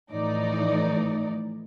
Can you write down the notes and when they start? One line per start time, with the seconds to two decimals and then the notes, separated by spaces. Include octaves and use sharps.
0.10 A2 E3 F3 D#4 D5